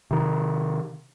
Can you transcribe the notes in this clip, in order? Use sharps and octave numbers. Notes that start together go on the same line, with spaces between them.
C3 D#3